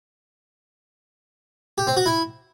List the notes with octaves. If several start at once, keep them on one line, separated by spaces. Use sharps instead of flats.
G4
C4
F#4
E4